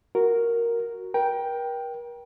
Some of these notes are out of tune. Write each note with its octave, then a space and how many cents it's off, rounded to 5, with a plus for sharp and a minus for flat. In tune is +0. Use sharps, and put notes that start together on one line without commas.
F#4 +0 A#4 +0
A#4 +40 G5 +0